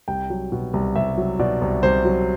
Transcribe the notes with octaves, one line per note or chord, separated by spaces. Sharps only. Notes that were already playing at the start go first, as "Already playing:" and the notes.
C2 G5
F#3
B2
C2
C2 E5
F#3
B2 D5
C2
C2 C5
F#3